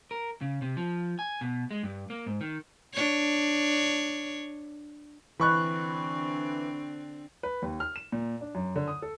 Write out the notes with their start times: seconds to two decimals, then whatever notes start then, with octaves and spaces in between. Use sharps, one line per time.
0.11 A#4
0.41 C#3
0.62 C3
0.77 F3
1.19 G#5
1.41 B2
1.71 G#3
1.83 G2
2.10 A#3
2.27 G#2
2.41 D#3
2.93 D4 C#5
5.40 D3 E3 C4 D4 B5 C#6 F#6
7.43 B4
7.62 D#2
7.80 F6
7.96 E7
8.12 A#2
8.41 D4
8.55 F#2
8.76 D3
8.88 D#6
9.02 A4